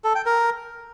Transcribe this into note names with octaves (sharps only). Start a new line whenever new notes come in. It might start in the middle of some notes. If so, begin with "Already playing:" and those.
A4
G5
A#4